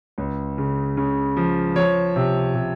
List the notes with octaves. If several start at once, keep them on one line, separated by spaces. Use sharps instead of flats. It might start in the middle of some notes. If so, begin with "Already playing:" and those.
C#2
C#3
C#3
F3
F3 C#5
C3
C3